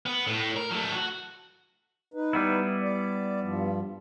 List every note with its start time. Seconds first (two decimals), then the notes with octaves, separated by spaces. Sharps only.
0.06 B3
0.27 A2
0.56 A#4
0.71 F#3 A3
0.95 F#4
2.14 D#4 B4
2.33 G3 B3 E4
2.82 D5
3.42 G2 F3